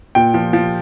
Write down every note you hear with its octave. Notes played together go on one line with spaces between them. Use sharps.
A#2 G5
F3
F3